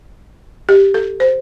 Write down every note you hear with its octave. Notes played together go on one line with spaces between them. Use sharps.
G4
A4
C5